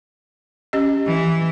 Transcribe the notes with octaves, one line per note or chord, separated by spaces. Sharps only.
C#4 G4 D#5
E3